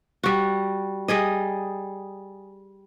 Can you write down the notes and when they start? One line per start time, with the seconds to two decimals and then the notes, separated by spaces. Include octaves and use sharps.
0.24 G3 F#4
1.08 G3 G#4 D#5